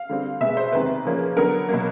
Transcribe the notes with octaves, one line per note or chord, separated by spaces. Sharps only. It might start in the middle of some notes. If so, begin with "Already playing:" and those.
Already playing: F5
D3 G3 C4
B2 G#3 B3 E5
C5
E2 C3 D#3 G#3 C4 B4
C#3 F3 A#3 C#4
D3 F#3 B3 A#4
B2 F#3 A#3